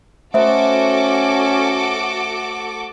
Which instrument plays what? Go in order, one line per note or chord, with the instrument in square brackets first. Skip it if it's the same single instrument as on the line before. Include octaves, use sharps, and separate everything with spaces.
[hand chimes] A3 C5 [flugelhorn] C#4 [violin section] F#4 A4 D6 [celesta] E5